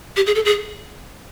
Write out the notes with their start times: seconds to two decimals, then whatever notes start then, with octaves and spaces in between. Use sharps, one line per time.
0.16 G4
0.27 G#4
0.35 A4
0.45 G#4